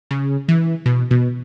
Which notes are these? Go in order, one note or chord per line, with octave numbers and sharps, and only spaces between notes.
C#3
E3
B2
B2